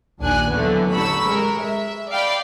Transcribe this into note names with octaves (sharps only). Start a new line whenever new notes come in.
A#1 D#2 D4 G#5 F#6
D3 E3 F#3 A3 B3
A1 D3 A4 B5 C#6 E6
G#3 A#4
E5
D5 F5 G5 B5